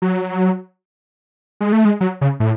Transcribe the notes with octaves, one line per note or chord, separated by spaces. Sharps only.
F#3
G#3
A3
G#3
F#3
C#3
A2